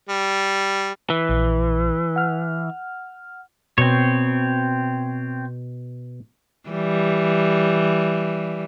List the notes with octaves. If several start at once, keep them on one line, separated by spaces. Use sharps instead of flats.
G3
E3
A#1
F#5 F6
B2 C4 C#5
E3 G3